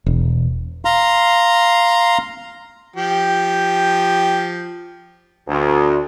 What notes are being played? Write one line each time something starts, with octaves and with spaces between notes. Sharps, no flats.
E1
F5 A#5 C6
F3 G4
D2